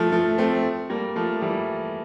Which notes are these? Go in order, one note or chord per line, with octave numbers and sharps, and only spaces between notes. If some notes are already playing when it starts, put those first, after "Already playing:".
Already playing: F3 A3
F3 A3
A3 C4
G3 A#3
F3 A3
E3 G3